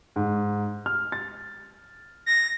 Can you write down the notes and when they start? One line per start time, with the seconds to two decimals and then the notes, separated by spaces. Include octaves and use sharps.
0.16 G#2
0.86 F6
1.12 A6
2.26 A#6